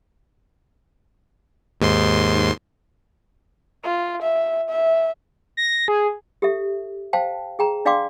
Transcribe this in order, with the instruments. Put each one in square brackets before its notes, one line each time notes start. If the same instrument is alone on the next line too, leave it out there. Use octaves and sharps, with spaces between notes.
[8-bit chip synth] D#2 G#2 C6
[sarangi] F4
E5
E5
[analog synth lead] A#6
G#4
[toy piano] G4 A4 E5
C5 F5 G5 A5
G#4 G5 A#5
D4 D5 F5 G5 C6 D6